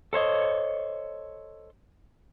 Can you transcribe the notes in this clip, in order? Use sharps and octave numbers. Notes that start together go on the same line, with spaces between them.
A4 C5 C#5 D#5